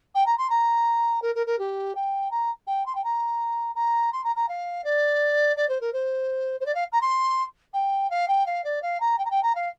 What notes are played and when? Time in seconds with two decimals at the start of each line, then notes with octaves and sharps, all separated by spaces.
0.14 G5
0.26 A#5
0.37 C6
0.50 A#5
1.22 A#4
1.35 A#4
1.46 A#4
1.58 G4
1.95 G5
2.31 A#5
2.67 G5
2.86 C6
2.95 G5
3.04 A#5
3.75 A#5
4.12 C6
4.24 A#5
4.36 A#5
4.48 F5
4.84 D5
5.56 D5
5.69 C5
5.81 A#4
5.93 C5
6.60 C5
6.66 D5
6.74 F5
6.92 A#5
7.01 C6
7.73 G5
8.10 F5
8.28 G5
8.46 F5
8.64 D5
8.82 F5
9.00 A#5
9.18 G5
9.25 A#5
9.30 G5
9.43 A#5
9.55 F5